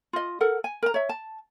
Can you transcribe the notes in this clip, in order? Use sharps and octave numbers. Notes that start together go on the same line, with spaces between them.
F4 D#5
A4 A#4 F#5
G#5
A#4 A#5
C#5 E5
A5